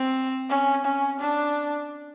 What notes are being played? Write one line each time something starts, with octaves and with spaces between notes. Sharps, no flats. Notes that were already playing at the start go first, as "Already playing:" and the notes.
Already playing: C4
C#4
C#4
D4